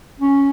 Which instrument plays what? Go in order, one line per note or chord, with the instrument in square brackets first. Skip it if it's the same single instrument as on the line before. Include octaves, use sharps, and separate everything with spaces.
[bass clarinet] C#4